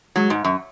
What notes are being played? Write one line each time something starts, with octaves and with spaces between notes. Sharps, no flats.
F#3 G#3
G#2
F#2